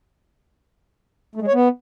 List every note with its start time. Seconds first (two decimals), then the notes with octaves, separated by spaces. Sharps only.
1.35 A3
1.42 G#3
1.48 C#5
1.54 B3